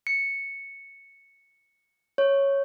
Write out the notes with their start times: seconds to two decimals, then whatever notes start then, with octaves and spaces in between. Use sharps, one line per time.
0.07 C#7
2.18 C#5